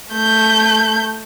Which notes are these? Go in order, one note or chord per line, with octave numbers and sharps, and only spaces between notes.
A3 G6